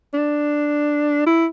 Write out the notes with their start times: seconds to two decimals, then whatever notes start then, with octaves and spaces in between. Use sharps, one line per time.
0.14 D4
1.26 E4